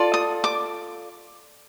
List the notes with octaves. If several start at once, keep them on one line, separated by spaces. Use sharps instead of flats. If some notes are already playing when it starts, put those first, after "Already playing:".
Already playing: F4 A4 D5
D#6
D6